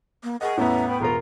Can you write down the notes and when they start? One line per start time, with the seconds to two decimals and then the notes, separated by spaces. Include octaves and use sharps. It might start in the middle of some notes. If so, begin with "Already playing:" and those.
0.24 A#3
0.41 G#4 A#4 D#5 F#5 C#6
0.58 E2 A2 B3 C#4 E4 E5 A5 A#5
0.87 B4 G5 B5
1.01 E1 F4 A#4 A#5